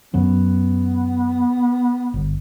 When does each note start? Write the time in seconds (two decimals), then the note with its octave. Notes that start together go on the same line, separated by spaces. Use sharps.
0.14 F#2 F#3 B3 C#4
2.14 G1